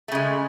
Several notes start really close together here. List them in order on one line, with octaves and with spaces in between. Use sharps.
A3 C#3 G#3